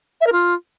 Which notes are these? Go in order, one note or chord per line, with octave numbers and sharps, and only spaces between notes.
E5
A#4
F4